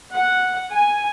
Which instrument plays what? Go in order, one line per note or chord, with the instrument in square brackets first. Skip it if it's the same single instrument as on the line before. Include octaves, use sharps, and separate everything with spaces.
[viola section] F#5
G#5